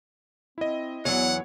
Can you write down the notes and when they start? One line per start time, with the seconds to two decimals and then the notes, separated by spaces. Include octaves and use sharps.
0.58 C4 E4 D#5
1.05 E2 E3 F#3 B3 C#5 F#5